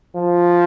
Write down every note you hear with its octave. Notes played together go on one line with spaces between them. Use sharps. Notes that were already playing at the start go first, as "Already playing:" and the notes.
F3